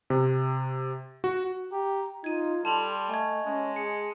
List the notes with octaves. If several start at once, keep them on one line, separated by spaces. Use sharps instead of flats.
C3
F#4
G4 A#5
D#4 F4 G#6 D#7
G3 A4 A5 C6 F7 F#7
A3 D#5 G#5 G#6
G#3 C#4
G#4 C#7